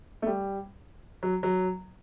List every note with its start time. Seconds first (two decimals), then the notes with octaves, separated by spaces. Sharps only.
0.22 A3
0.26 G3
1.23 F#3
1.43 F#3